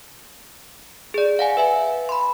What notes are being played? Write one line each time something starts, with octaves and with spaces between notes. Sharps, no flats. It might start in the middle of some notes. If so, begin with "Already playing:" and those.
G#4 D5
F5 F#5 G#5
B4 E5 G#5
B5 C6